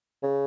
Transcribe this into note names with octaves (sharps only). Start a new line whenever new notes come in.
C#3